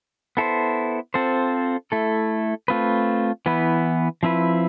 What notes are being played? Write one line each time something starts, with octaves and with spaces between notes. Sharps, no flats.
B3 E4 A4 C5
C4 F4 A4 C5
A3 E4 A4
A3 C4 F4 B4
E3 B3 E4 B4
F3 C4 E4 B4